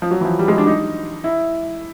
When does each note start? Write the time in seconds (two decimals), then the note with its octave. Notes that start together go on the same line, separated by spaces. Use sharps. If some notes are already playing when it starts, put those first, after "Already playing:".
0.02 F3
0.11 F#3
0.21 E3
0.25 F3
0.39 G3
0.48 G#3
0.58 D4
0.67 D#4
1.24 E4